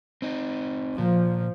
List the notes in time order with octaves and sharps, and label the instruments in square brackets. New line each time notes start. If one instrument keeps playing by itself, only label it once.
[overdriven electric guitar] C4 D#4
[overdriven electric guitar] A#2 [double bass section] F3